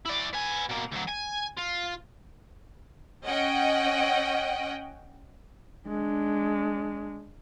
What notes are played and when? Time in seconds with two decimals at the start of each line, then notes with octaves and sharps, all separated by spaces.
0.06 E4 D5
0.33 B3 G#5
0.69 B2 A#3
0.92 D2 F#3
1.08 G#5
1.57 F4
3.24 C#4 D#5 F#5 G5
5.88 G#3 D4